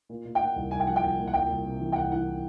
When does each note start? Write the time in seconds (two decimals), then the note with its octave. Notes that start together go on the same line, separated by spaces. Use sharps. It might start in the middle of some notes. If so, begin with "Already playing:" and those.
0.09 A#2
0.25 A#2
0.35 G5
0.40 A#2 F#5
0.56 C2
0.71 C2 G#5
0.80 G5
0.87 F3 F#5
0.96 G5
1.03 C2
1.19 A#2
1.28 F#5
1.34 C2 G5
1.49 C2
1.65 C3
1.80 E3
1.92 G5
1.96 C2 F#5
2.12 E3 F#5